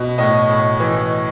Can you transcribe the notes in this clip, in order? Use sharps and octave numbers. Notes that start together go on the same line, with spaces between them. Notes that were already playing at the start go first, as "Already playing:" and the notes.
Already playing: B2
A2 D#5
A2
E3